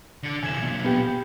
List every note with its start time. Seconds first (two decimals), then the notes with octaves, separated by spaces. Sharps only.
0.23 D3 A4
0.43 E2 C3 G#5 G#6 E7
0.60 B1 A#2
0.84 B3 G4 G5